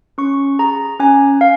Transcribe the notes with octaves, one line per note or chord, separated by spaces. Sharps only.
C#4 C#6
G#4 A#5
C#4 G#5
F5